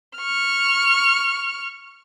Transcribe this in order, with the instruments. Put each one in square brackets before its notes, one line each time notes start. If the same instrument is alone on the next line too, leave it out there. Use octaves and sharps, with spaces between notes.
[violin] C#6 F6